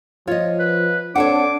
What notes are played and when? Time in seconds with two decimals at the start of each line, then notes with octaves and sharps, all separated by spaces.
0.27 F3 F4 C#5 D#5
0.59 B4
1.15 C4 D4 A4 C#5 F#5 D6